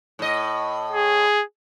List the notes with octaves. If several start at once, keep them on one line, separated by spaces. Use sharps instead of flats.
A2 D#5
G#4